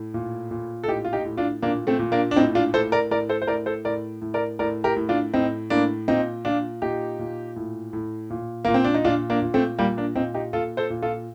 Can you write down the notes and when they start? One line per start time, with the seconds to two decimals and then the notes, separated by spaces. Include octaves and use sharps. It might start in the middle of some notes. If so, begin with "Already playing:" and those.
Already playing: A2
0.14 A#2
0.51 A#2
0.84 A4
0.88 A2 D#4 G4
1.04 F4
1.13 D#4 G4
1.25 A2
1.37 D4 F4
1.62 A#2 A#3 D4
1.87 A3 C4
1.99 A#2
2.12 A#3 D4
2.31 D4
2.36 A2 C4 D#4
2.55 D4 F4
2.74 A2 A4 C5
2.92 A#4 D5
3.11 A2 A#4 D5
3.29 A4 C5
3.42 C5
3.47 A2 A#4 D5
3.66 A4 C5
3.85 A2 A#4 D5
4.22 A2
4.34 A#4 D5
4.59 A2 A#4 D5
4.84 G4 A#4
4.96 A2
5.09 D4 F4
5.34 A2 C4 D#4
5.70 A2 A#3 D4
6.08 A#2 C4 D#4
6.45 A#2 D4 F4
6.82 A#2 D#4 G4
7.19 A#2
7.56 A2
7.93 A2
8.30 A#2
8.65 A#2 A#3
8.74 C4
8.84 D4
8.94 D#4
9.05 A#2 D4 F4
9.30 A#3 D4
9.42 A#2
9.54 A3 C4
9.78 A#2 G3 A#3
9.97 A#3 D4
10.16 A#2 C4 D#4
10.34 D#4 G4
10.53 A#2 F4 A4
10.77 A4 C5
10.90 A#2
11.02 F4 A4